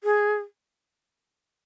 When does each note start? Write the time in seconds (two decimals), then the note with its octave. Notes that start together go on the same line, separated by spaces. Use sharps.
0.04 G#4